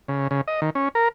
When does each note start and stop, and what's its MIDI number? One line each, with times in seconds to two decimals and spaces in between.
0.08 0.28 49
0.31 0.41 49
0.48 0.61 75
0.62 0.70 51
0.75 0.89 61
0.95 1.08 70